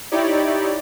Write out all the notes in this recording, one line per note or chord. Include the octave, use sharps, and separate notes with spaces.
D#4 E4 G4 C#5 D5